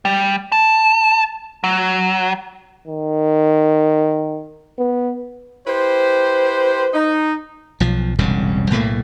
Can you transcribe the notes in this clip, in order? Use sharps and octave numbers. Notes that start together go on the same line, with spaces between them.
G3
A5
F#3
D#3
B3
E4 G4 B4 C5
D#4
B1 F3
E1 C2 G2 C#3
B1 A2 A3 A#3